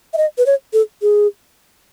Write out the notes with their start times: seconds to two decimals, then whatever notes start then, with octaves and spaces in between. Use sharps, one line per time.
0.13 E5
0.17 D#5
0.38 B4
0.46 C#5
0.73 A4
1.02 G#4